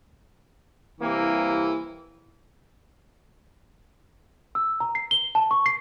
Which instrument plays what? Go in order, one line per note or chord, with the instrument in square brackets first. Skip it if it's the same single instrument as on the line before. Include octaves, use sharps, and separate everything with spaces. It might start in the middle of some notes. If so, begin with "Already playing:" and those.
[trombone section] C2 C3 A#3 [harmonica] E3
[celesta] E6
A#5
C7
G7
A5
C#6
C7